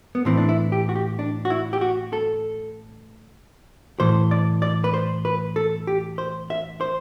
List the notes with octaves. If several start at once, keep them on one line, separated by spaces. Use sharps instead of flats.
B3
A2 E3 C4
D4
E4
G4
F#4
G4
D4
F#4
E4
G4
F#4
A4
A2 E3 C5
D5
D5
B4
C5
B4
A4
G4
C5
E5
C5